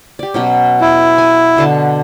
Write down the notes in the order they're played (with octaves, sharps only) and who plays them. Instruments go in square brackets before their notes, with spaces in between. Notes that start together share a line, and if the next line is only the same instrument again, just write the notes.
[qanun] G4 D5
B2 F#3 C#4
[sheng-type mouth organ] E4
[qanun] G#5
B2 D3 A5